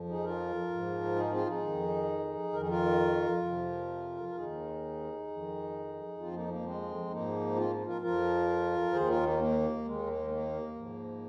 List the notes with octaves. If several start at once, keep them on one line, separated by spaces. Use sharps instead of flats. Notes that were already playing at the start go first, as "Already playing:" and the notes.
Already playing: F2 F3
D#4 G#4
F4 A#4
G#2 F3
D#4 G#4
C4 F4
D#4 G#4
D#3
F2
F2 D#3 A#4
G#4
F4 A#4
F2 C3 F3
A#4
D#2 D#3 D#4 G#4
F2 D#3
F2 F3 C4 F4
A#3 D#4
A#3
G#3 C4
G#2 F3 A#3 D#4
C4 F4
F4 A#4
F2 F3 F4 A#4
D#2 D#3 G#4 C5
F4 A#4
A#3 D#4
A#3
D#2 D#3 G#3
A#3
A#3
G#2 F3